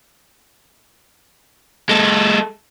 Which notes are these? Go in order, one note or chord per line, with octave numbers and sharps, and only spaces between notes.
G#3 A4